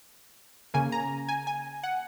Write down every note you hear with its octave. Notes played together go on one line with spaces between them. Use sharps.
C#3 A#3 G#5
A#5
G#5
G#5
F#5